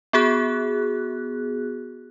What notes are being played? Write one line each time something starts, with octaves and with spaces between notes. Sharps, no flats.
B3 F#4 G#4 F#6